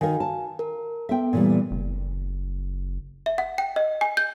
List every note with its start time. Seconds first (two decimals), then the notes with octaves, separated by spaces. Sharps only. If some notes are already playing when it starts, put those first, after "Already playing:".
0.01 D#3 F#4 A#4 F5 G#5
0.20 A5
0.59 A#4
1.09 B3 A4 E5 G5
1.33 A#2 E3 G3
1.71 F#1
3.26 E5
3.38 F#5
3.58 G5
3.76 D#5
4.01 G#5
4.17 G6